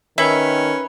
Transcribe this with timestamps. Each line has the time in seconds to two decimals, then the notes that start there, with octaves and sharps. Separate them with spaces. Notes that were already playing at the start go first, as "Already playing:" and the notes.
0.18 D#3 C#4 B4 E5